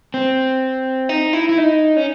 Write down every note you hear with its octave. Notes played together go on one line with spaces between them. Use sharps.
C4
D#4
E4
E4
D#4
C#4